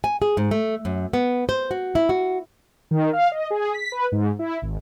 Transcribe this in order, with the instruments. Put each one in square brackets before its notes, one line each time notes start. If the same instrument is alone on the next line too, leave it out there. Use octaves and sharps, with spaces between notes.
[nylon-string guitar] G#5
G#4
G#2
A3
F#2
B3
C5
F#4
E4
F#4
[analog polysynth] D#3
F5
D#5
G#4
B6
B4
G#2
E4
G#1